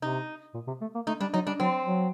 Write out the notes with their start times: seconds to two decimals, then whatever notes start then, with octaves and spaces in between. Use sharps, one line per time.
0.02 C3 D#4
0.54 A#2
0.67 C3
0.81 A3
0.95 A#3
1.07 A3 D#4
1.20 G3 D4
1.34 F#3 D#4
1.47 G3 D4
1.60 F#3 C4
1.86 F#3